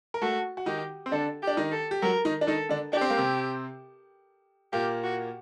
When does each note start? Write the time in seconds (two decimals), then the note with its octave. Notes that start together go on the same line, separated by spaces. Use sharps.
0.14 A#4
0.22 A3 F#4 A4
0.57 F#4
0.66 D#3 D#4 G4
1.06 C4
1.11 D3 D4 A4
1.43 G4
1.47 D4
1.57 D#3 D#4
1.72 A4
1.91 G4
2.02 F#3 F#4 A#4
2.25 D#3 D#4
2.41 D4
2.47 D#3 D#4 A4
2.69 D3 D4
2.93 D4 G4
3.01 C4
3.10 A#3
3.17 C3 C4
4.73 A#2 A#3 G4
5.04 F#4